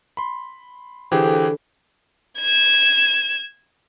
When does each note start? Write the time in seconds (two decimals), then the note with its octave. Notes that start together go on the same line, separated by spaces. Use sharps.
0.17 B5 C6
1.12 D3 E3 G4 G#4 C5
2.39 G#6 E7